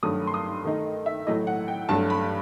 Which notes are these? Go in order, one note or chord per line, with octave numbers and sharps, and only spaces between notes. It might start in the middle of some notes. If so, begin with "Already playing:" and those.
G2 D#3 F#3 A3 D#6
C6
D#6
D#3 A3 D#4
E5
A2 F#3 A3 E4 D#5
F#5
G5
G2 F#3 A3 A5
B5